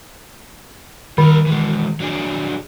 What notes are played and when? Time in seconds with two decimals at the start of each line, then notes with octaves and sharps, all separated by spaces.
1.18 D#3 G3 A#4
1.46 E3 G#3
2.00 F#3 D4 G#4